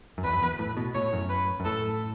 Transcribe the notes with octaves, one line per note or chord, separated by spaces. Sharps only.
F#2
E2 B4
F#2
E2
A2
B2
A2 C#5
F#2
B4
F#2
A2 A4